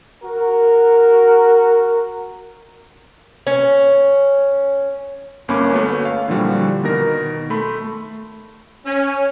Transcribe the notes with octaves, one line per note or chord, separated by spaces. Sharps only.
F#4 A#4
C#4
G1 A#3 C#4 B5 D6
A3 B3 F#4 C#5
F5
A#2 D3 E3 F3 G3 F#4
B2 D#3 A#4 A#6
A3 B5 C6
C#4